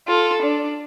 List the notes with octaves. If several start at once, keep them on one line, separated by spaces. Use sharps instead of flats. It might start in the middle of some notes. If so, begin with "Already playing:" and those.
F4 A4
D4